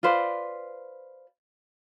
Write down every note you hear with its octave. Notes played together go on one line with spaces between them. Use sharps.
F4 B4 C5 D5